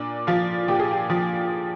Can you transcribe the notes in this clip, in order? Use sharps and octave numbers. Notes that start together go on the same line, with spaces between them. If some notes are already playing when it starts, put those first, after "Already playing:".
Already playing: A#2 D4
F3 F4
A#2 G4
G#4
G4
F3